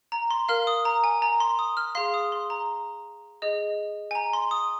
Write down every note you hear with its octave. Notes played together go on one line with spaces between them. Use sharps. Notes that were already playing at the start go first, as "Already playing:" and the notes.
A#5
C6
A#4 F5 F6
D#6
A#5
G#5
A#5
C6
D#6
F6
G#4 F5 C6
D#6
C6
A#5
G#4 D#5
G#5
A#5
C6
D#6